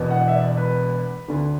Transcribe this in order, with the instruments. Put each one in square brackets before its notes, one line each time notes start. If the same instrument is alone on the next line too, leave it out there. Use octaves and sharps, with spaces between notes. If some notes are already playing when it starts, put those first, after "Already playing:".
Already playing: [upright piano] E1 E2 B2
F#5
E5
D5
B4
D2 D3